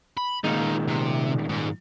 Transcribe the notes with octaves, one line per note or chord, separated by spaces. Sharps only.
B5
A#2 D#3 G#3 D#4 F4
C3
G#2